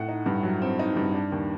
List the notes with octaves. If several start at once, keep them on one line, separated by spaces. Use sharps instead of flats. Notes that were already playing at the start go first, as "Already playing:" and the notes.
Already playing: A2 F#5
D#4
G2
F#3
C4
D#4
G2
D4
D#2